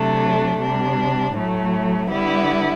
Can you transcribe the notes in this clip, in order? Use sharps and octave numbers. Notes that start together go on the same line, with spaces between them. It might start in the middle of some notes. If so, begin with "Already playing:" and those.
Already playing: C3 F#3 A3 D4
C3 G3 D4
A2 F#3 A3
D3 G3 B3 E4